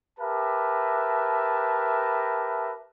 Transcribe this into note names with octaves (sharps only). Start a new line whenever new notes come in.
G4 A#4 B4 E5 A5